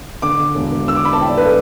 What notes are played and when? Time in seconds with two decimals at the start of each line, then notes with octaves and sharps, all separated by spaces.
0.22 D3 D6
0.39 D3
0.55 E1
0.72 E1
0.88 D3 E6
0.96 D6
1.05 D3 B5
1.13 A5
1.21 A1 G5
1.29 D5
1.37 D3 B4
1.45 A4